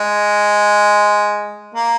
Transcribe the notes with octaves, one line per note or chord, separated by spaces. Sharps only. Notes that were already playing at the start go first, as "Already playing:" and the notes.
Already playing: G#3
A#3